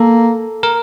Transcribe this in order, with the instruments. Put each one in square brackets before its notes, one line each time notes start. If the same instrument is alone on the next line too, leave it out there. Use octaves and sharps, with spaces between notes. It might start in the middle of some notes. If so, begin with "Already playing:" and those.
Already playing: [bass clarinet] A#3 [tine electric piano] A4
[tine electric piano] A#4